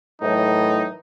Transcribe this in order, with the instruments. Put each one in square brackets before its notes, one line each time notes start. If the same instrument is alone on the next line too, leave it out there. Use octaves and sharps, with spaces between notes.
[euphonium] A2 [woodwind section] D#3 E3 F#3 [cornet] D#4